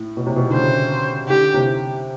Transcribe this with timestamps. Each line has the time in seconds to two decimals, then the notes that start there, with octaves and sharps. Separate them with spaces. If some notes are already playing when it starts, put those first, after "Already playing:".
Already playing: A2
0.17 B2
0.27 C3
0.36 B2
0.50 D3
0.54 C#3 C5
1.29 D3 G4
1.54 C3